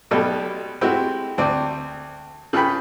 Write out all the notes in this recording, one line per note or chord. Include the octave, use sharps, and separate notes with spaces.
B1 B2 G3 A3 A4
G#3 A3 C4 E4 F#4 G4
D2 C4 D5
C#3 A4 B4 G5 B5